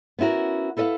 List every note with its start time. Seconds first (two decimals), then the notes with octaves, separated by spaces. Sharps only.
0.19 B3 C#4 E4 F#4 A#4
0.77 E4 A4 B4 D#5 F5 F#5